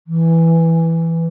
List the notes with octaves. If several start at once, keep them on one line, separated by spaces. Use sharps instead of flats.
E3